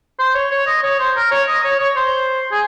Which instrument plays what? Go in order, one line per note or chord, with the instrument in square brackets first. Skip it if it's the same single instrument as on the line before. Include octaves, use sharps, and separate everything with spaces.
[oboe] C5
C#5
C#5
D#5
C#5
C5
A#4
C#5
D#5
C#5
C#5
C5
G#4